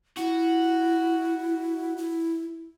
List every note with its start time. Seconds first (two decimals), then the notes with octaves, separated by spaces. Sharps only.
0.17 E4 F#4
1.98 E4